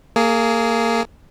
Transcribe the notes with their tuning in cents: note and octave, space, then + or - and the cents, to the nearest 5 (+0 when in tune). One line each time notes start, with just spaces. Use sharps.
A#3 -20 G#4 +10